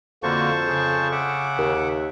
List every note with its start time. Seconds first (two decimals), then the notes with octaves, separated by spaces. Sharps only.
0.23 F2 D3 A#3 F#4 C5 A5 C#6
0.67 C#3
1.12 E5 F#5 D6
1.58 D#2